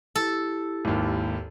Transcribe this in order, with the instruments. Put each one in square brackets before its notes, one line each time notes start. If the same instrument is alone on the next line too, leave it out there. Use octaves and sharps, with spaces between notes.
[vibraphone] E4 G4 [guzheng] A4
[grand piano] G#1 D#2